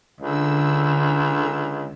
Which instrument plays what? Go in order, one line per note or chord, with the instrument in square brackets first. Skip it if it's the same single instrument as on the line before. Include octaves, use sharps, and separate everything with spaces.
[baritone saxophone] C#2 [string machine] D3 E6